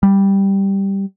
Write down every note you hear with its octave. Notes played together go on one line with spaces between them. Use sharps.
G3